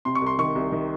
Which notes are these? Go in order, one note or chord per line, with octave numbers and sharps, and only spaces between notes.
C3 C6
C#6
C2
C6
D#3 C#6
C2
D#3